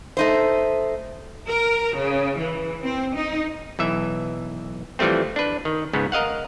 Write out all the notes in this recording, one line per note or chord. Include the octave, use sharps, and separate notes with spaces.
A3 D#4 C5
A#4
C#3
E3
C4
D#4
B1 E3 E5
E3 F3 G3 A3 C4
D4 B4
D#3
C#2 G#2 C#3 B3
A#4 D#5 F5 F#5